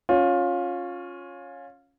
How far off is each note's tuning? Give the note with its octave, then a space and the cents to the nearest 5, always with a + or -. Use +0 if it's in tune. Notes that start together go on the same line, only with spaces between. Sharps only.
C#4 +0 F4 +20